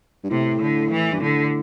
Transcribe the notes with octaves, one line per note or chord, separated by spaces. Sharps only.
G2
A2 C3
D3
E3
G2
A2 D3